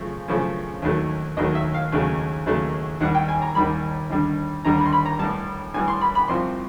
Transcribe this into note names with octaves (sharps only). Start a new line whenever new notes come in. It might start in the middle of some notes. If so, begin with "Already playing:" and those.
Already playing: F#2 C#3 F3 A3
F#2 C#3 F3 A3
D#2 D#3 F#3 A3
D#2 D#3 F#3 A3 D#5
E5
F5
D#2 C#3 F#3 A3
D#2 C#3 F#3 A3
D#2 D#3 G3 F#5
G5
G#5
A#5
D#2 D#3 G3 B5
D#2 D3 G3
D#2 D3 G3 A#5
B5
C6
B5
A#5
A2 E3 G3 A5
A2 E3 G3 G#5
C6
B5
B5
C2 C3 F3 C6